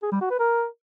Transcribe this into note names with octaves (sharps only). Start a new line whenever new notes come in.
G#4
G3
F#4
B4
A#4